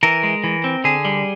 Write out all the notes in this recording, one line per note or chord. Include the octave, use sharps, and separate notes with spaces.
E3 A#4
G#3
E3
C4
D3 G#4
G3